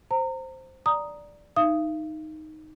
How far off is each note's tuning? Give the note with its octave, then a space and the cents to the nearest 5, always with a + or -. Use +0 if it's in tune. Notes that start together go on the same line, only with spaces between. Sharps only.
C5 +0 A#5 -30
D5 +0 A#5 +0 D#6 +0
D#4 +0 F5 -45 D#6 +0